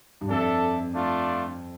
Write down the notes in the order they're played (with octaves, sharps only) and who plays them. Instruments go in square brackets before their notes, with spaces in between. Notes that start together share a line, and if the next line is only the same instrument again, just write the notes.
[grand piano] G2
[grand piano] F2 [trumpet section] D4 A4 E5
[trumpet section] A3 D4 F4